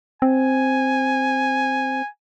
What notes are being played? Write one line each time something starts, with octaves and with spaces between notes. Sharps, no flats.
C4 G#5